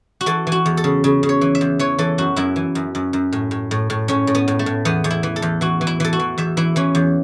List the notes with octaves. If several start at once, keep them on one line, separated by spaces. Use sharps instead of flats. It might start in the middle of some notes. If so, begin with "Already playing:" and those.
F#4
E3 A4
E3
F#4
E2
A4
C#3
C#3
C#3
C#5
E3
E5
E2
E3 C#5
E3 A4
F#2 F#4
F#2 E4
E3
F#2
F#2
F#2
A2
A2
A2
A2
A2 C#4
A2
B3
A2
A3
A2
E2 B3
E2
E4
E3
A4
E2
E3 F#4
E3
E4
E3 A4
F#4
E3
E2 E5
E3 E4
E3 C#4
E2